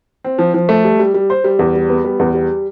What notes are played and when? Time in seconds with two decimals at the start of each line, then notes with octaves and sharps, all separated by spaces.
0.24 C4
0.39 F3
0.54 F3
0.69 A3
0.84 G3
0.99 G3
1.14 G3
1.30 C5
1.44 G3
1.59 E2
1.75 G3
1.89 B3
2.05 G3
2.19 E2
2.34 G3